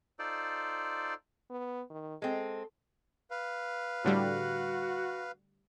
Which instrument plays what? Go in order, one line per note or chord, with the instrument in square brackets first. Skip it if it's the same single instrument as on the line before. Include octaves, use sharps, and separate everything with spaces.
[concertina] D#4 F4 A4 C5 D5
[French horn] B3
D#3
[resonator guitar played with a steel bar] G#3 C4 [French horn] A4
[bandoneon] B4 F5
[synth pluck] A2 D3 G3 [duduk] F#4